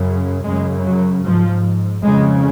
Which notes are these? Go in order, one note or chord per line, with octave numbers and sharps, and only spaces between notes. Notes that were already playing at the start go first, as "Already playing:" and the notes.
Already playing: F#2 C#3
F#2 C#3 G#3
F#3
G#2 F3
F2 C#3 G#3